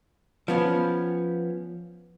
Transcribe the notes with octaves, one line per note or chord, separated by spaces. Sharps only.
F3 B3 C#4